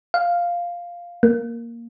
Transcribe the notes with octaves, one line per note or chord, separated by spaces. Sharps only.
F5
A#3